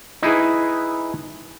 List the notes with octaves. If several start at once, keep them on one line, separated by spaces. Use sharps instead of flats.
D#4 E4 G#4 B4